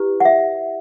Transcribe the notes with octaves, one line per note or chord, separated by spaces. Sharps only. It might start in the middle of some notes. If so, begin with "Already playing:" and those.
Already playing: E4 G4 B4
F#5
E5